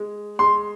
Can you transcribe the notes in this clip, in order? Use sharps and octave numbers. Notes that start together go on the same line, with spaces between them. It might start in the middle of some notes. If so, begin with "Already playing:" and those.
Already playing: G#3
G#3 C6